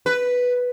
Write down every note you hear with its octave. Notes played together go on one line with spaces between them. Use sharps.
B4